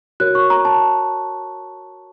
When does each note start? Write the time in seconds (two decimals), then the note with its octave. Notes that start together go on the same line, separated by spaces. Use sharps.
0.20 F#4 A#4 C#5 F#6
0.35 C#6
0.50 A#5
0.65 A5